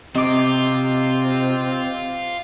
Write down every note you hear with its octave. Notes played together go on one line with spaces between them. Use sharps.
C3 C4 F4 D#5 D6